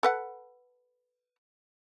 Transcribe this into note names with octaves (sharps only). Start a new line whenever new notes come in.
A4 B4 F#5